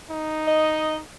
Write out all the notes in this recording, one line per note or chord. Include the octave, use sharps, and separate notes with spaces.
D#4
D#5